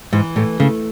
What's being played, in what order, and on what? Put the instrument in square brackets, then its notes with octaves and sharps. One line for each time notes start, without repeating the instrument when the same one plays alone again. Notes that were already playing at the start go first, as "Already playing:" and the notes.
[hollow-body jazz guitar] G#2 [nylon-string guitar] E3
[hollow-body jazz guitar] A2 [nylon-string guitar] A3
[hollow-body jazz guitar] C#3 [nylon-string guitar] A3